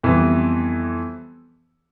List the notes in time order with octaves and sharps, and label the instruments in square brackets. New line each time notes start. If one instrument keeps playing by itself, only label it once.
[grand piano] F2 E3 G3 B3